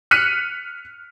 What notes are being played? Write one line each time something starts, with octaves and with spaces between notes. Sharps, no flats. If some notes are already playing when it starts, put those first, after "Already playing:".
F6 F#6 B6 C#7 D#7